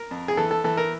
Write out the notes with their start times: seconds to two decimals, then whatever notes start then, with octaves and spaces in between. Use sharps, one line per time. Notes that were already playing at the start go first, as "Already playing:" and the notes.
Already playing: A#4
0.11 F2
0.28 G#4
0.37 E3 A4
0.51 A4
0.64 E3 A4
0.77 A#4